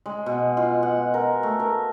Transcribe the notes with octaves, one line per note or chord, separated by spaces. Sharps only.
G#3
B2
F4
F#5
A#4
A3
A#4